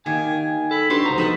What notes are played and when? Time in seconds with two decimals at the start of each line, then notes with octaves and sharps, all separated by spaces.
0.06 D#3 A#3 G4 G#5
0.71 A4 B5
0.90 D4 F#4 G4 B4 C6
1.06 C#2 C5 A#5
1.18 F3 D#4 A4 B5 C#6